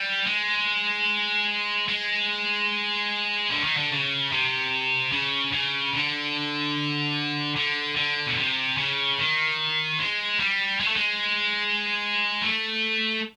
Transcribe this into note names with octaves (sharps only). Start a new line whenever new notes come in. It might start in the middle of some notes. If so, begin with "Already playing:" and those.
Already playing: G3
G#3
G#3
D3
D#3
D3
C#3
C3
C#3
C#3
D3
D3
D3
B2
C3
C#3
D#3
G#3
G3
G#3
A3
G#3
A3